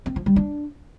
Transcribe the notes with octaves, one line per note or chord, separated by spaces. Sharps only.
C4
F3
G3
D4